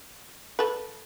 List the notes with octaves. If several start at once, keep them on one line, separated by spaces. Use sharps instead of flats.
A4 B4